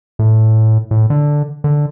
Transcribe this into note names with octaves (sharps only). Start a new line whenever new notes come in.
A2
A2
D3
D3